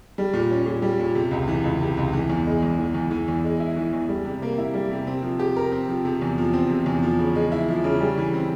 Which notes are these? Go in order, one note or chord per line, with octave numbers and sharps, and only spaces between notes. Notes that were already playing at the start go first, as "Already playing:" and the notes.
G3
A#2
C#4
A#2
G3
A#2
C3
C#2
E3
C#2
C3
C#2
E3
E2
G#3
E2
E3
E2
E3
E2
G#3
E4
E3
E2
G3
C3
A#3
E4
G3
C3
C4
F3
G4
A#4
C4
F3
C3
E2
F3
C4
C3
E2
F3
C#3
G#3
E4
F3
C#3
G3
E3
C4